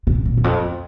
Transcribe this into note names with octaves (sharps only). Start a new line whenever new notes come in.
C3
A#2
E2
F2